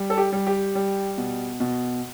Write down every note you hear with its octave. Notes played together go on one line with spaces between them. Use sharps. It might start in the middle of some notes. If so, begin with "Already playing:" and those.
Already playing: G3
A4
G4
G3
G4
G3
B2
B2